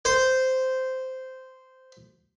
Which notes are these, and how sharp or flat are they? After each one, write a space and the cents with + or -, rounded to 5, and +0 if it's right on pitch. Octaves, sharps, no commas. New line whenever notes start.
C5 -10